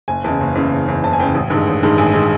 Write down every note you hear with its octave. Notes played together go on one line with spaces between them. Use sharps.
F#1 G#5
E2 C#3 A5
F#1
E2 C#3
F#1
E2 C#3
F#1 A5
G#5
E2 C#3 G5
A1
G2 D#3 G#3
A1
G2 D#3 G#3
A1 G#5
D#3 G#3